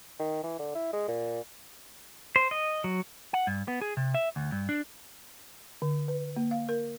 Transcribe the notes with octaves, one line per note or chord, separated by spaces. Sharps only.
D#3
E3
D3
E4
G#3
A#2
C5
D#5
F#3
F#5
G2
B3
G#4
C3
E5
D2
G2
D4
D3
B4
A#3
F5
A#4